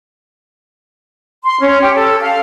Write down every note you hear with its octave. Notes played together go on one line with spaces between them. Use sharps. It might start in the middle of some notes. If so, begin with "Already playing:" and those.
C6
C#4
G4
A4
F5